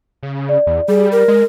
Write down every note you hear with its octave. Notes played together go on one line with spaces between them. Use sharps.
C#3
D5
E2
G3 G#4
A#4
G#3